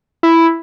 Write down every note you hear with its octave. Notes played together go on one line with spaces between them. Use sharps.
E4